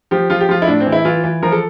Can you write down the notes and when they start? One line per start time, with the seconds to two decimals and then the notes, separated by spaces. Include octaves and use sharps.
0.11 F3 G4
0.30 F3 F4
0.40 G4
0.49 F3 F4
0.62 E4
0.67 A2 D4
0.80 C4
0.86 E3
0.92 E4
1.05 E3 F4
1.24 E3
1.43 F3 A#4
1.52 A4